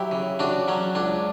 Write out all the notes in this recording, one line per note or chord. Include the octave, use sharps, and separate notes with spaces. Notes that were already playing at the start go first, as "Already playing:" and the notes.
Already playing: F#3 E4 G4
C#3
C#3 D4 F#4
F#3 C#4
C#2 D4